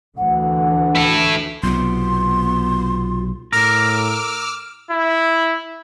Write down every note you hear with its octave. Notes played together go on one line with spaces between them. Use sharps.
D2 D3 E3 F#5
E4 A4
B1 C3 B3 F4 C6
A2 A#4 D6 E6 F6
E4